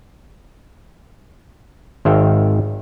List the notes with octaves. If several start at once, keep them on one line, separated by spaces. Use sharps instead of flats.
G#1 D#3 C5 E5 F5 G5